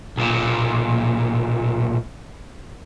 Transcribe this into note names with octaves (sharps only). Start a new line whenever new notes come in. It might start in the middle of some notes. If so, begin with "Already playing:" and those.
B1 A#2